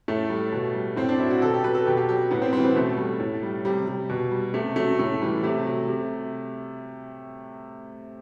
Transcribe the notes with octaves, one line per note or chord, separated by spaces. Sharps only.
A2 A3
G3
B2
G3
A2 C4
D4
F#3 E4
F#4
B2 A4
G4
F#3 B4
A4
B2 G4
G4
F#3 G4
A2 B3
C4
E3 G3 C4
B3
B2 A3
G3
A2
G3
C3 G3
G3
B2
G3
C3 A3
F#3 A3
A2 A3
E3 G3
C3 A3
F#3
C3